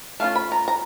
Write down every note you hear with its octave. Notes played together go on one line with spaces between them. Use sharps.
A3 C#4 F4 F5
B5
A#5
A#5